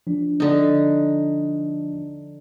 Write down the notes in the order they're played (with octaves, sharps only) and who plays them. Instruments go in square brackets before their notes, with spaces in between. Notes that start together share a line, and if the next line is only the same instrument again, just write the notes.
[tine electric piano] F3 D4
[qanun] D3 D#4